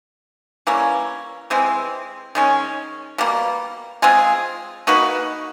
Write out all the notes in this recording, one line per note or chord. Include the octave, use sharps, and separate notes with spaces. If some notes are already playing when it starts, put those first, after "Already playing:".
E3 G3 A#3 C#4
C3 E3 G#3 C4
D#3 G#3 C#4
B2 G3 A#3
G#3 C4 F4 G#4
A#3 D#4 F#4 B4